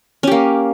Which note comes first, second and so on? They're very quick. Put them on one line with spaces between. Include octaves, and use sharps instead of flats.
C#4 G4 A#3